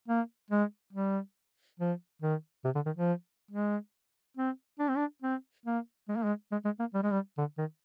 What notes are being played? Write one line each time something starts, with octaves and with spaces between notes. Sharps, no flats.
A#3
G#3
G3
F3
D#3
C3
D3
D#3
F3
G#3
C4
D4
C4
D4
C4
A#3
G#3
A#3
G#3
G#3
G#3
A#3
G3
G#3
G3
D3
D#3